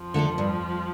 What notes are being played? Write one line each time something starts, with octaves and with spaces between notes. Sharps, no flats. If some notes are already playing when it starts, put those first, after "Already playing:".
Already playing: F2 F3
D3 A3 D4 A4
G2